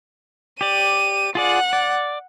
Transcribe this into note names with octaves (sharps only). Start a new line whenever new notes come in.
G4 D5 D#7
F4 G#4 D5 F#5
D5